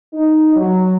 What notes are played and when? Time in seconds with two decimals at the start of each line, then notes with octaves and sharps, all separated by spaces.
0.14 D#4
0.56 F#3